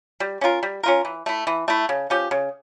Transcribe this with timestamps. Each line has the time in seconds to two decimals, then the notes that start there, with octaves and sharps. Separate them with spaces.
0.20 G3
0.41 C#4 F4 A#4
0.63 G3
0.83 C#4 F4 A#4
1.05 E3
1.26 A3 E4
1.47 E3
1.68 A3 E4
1.89 C#3
2.10 F3 C#4 G4
2.31 C#3